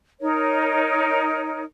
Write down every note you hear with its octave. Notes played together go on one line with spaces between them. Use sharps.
D#4 A#4 C#5